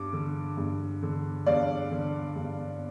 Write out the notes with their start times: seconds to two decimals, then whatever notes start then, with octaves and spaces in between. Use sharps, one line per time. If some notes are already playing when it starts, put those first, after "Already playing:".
Already playing: G2 D6
0.13 D3
0.57 G2
1.03 D3
1.46 G2 D5 F5
1.92 D3
2.36 G2